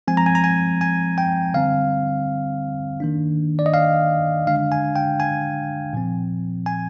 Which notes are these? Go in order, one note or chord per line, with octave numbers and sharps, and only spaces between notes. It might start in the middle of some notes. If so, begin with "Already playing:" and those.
F3 G#3 C4 G#5
A#5
G#5
A#5
G#5
G#5
G5
D3 G3 C4 F5
D#3 A#3 D4
D5
D#5
F5
D3 G#3 D4 F5
G#5
G5
G#5
A#2 F3 C4
G#5